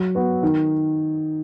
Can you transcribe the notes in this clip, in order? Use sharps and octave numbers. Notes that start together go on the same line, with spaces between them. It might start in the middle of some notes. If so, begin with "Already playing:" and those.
Already playing: F#3
B3 F#4 B4
D#3